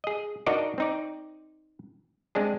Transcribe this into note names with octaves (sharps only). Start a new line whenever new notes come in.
G#4 D#5
D4 D#4 F#4 A#4 D5 D#5
C4 D#4 D5
G#3 C4 D4 G#4